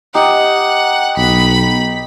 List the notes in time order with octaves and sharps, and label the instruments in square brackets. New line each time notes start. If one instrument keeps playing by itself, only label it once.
[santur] D#4 G4 [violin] F#5
[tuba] B1 [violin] B5